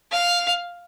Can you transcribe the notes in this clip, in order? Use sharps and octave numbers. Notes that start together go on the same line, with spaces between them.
F5